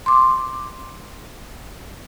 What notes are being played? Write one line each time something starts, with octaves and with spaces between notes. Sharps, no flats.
C6 D6